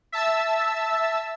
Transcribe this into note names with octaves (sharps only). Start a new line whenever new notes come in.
E5 A5 E6